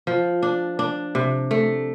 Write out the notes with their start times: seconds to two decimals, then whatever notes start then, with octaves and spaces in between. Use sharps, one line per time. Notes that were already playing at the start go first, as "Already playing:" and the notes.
0.07 F3
0.43 D4
0.79 D4
1.15 C3
1.51 A3